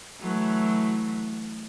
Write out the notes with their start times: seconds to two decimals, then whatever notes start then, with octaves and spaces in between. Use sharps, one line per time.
0.20 E3 F#3 A3